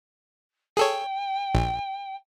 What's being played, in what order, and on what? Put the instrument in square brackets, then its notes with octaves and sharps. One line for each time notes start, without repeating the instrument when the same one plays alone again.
[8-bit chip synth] G#4 A4 C#5 [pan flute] G5
[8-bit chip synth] A#1